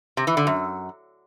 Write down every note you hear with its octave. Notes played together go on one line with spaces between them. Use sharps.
C3
E3
D3
F#2